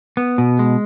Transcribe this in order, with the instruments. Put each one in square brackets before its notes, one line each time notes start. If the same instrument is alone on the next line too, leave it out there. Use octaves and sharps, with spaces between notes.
[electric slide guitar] B3
B2
G#3